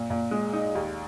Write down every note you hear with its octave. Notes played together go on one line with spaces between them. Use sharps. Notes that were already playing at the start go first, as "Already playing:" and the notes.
Already playing: A#2
A#2
G#3
D#4
D#2